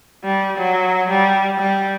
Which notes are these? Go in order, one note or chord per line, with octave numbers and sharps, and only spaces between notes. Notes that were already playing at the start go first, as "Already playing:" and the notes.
G3
F#3
G3
G3